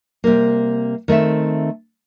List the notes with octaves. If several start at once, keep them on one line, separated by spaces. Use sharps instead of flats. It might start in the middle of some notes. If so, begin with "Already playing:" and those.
C3 G3 A#3
D#3 A3 C4 E5